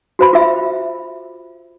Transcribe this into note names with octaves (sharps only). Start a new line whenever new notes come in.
F#4 C5 B5
F4 E5